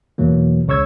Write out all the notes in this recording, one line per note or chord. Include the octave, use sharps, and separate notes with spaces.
E2 B2 E3 F#3 A#3
C#2 C#3 C#5 C#6 E6 G#6